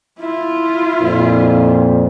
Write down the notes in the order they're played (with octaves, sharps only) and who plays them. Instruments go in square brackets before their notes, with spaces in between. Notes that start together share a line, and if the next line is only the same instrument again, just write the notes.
[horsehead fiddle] E4 F4
[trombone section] F2 A#2